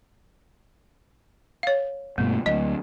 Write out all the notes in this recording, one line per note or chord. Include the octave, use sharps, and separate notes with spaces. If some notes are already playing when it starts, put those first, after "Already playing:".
C#5 F5
G2 B2 A3 A#3
D2 F#3 D#5